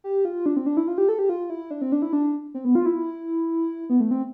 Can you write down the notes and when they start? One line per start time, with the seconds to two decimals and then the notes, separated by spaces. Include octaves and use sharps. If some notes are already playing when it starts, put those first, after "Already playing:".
0.04 G4
0.25 F4
0.46 D4
0.57 C4
0.66 D4
0.77 E4
0.88 F4
0.98 G4
1.09 A4
1.19 G4
1.29 F4
1.50 E4
1.71 D4
1.82 C4
1.92 D4
2.02 E4
2.13 D4
2.54 C4
2.65 B3
2.75 F4
2.86 E4
3.90 B3
4.00 A3
4.11 C4